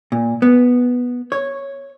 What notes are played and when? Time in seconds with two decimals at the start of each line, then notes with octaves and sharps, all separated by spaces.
0.12 A#2
0.42 B3
1.32 C#5